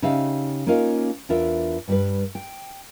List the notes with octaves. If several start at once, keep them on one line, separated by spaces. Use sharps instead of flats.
C#3 D#4 G4 E5 F5
A#3 C#4 D#4 F4 A#4 F5
E2 D4 F4 A#4 E5
G2 G3 B4
G5